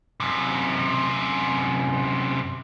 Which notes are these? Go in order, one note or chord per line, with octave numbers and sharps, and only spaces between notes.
F#2 C3